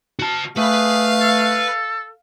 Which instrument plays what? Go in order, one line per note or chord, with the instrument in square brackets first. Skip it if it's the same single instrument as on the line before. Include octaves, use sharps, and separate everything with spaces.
[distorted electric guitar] F#4 A5
[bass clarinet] A3 [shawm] G#4 [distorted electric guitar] B4 [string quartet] F5
[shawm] A4